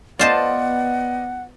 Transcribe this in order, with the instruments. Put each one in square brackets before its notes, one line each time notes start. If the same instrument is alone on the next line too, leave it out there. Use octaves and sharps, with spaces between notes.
[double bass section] B3 [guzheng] F4 C5 A5 [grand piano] D5 D#5 [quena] F#5